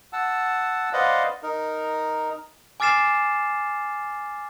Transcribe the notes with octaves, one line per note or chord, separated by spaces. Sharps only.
F#5 A5 E6
B4 C5 D5 D#5 F5 F#5
D#4 A#4
G#5 D6 F6 A6 C7 E7